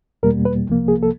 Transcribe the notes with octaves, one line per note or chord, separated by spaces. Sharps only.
E2 B2 G3 A#3 A#4
B4
C2 C3 F3 A#3
G#4
A4